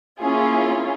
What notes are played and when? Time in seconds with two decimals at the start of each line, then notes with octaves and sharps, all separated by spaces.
0.19 A#3 C#4 E4 F4 G#4